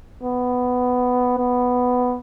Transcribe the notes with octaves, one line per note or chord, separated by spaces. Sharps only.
B3
B3